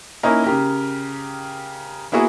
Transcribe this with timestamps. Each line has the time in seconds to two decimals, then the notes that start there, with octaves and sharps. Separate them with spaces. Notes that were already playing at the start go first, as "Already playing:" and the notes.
0.23 A#3 C#4 D#4 E4 A#4
0.44 C#3 G4 A#4
2.12 A#3 B3 E4 F#4 G#4